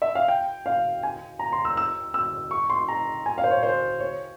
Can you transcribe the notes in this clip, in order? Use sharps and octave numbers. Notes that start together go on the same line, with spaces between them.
E5
F5
G5
F5
G#5
A#5
C6
E6
E6
E6
C#6
C6
A#5
G#5
F5
C5
C#5
C5
C#5